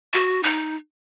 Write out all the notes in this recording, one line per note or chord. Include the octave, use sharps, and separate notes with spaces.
F#4
D#4